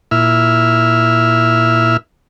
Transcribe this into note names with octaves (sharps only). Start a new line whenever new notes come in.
A#2 E4 E5 F6